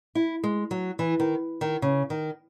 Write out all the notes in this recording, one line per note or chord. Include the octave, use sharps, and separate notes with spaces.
E4
G#3
F#3
E3
D#3
D#3
C#3
D#3